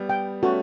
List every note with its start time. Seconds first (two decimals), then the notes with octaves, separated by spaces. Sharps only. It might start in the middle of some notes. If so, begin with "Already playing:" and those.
Already playing: G3 B3
0.09 G5
0.43 A3 C#4 F#4